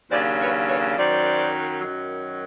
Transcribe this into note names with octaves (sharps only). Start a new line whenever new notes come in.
D#2 C#3 F#3 A#3 D4 C5 D5
B4 C#5
B4 C#5
F#2 D#3 F#3 C5 D5
F#2 D#3 F#3